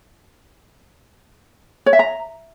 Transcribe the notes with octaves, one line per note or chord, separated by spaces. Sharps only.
C#5
E5
A#5